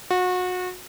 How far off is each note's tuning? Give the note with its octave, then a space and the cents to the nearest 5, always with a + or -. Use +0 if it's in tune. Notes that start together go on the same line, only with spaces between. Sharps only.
F#4 -30